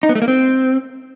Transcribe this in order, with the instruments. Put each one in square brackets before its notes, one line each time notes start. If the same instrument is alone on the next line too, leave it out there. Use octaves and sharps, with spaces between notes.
[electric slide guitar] D#4
B3
A3
A#3
C4